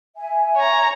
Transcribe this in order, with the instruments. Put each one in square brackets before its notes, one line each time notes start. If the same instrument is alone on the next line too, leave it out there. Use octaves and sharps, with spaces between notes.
[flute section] E5 G#5
[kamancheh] C#5 A#5